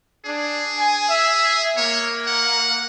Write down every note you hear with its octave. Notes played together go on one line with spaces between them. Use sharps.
D4 G#4
G#5
E5
A#3 C#5
F#5